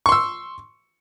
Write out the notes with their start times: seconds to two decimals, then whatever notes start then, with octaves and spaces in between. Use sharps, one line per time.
0.06 C#6
0.09 C6
0.12 E6